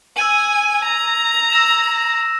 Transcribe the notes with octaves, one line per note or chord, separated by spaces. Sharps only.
G#5 E6 G#6 D#7 F#7
A#5
E6 A#6 E7